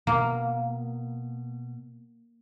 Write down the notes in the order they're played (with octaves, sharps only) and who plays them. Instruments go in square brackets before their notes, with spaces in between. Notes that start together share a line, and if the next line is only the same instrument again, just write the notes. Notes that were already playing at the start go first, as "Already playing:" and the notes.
[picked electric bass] B2 [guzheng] A#3